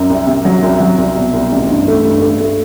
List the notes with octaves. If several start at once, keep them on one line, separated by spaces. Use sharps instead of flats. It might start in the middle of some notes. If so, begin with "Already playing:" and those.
Already playing: F#2
C2
C3
F#3
C2
F#3
C2
B2
C2
A1
G2
A3
G2
A3
A3